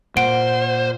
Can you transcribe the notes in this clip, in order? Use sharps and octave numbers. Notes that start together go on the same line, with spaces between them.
A#2 C5 F#5 D7